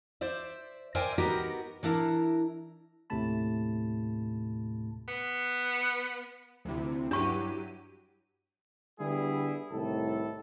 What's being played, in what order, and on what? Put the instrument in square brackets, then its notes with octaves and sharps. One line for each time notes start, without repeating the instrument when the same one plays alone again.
[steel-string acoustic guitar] C5 D5 E5
A#4 C5 D5 E5 G5 G#5
B3 D#4 F#4 G4 A#4
E3 D4 E4 A#4
[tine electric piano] D#2 A2 C3 A3 A5 B5
[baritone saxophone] B3
[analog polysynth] D2 C3 [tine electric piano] F3 E4
[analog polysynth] G2 [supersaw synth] F#3 G4 D#7 [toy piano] D4 C#6 [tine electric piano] E4 F#4
[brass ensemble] D3 G3 B3 E4 G#4
C2 A2 D#3 A4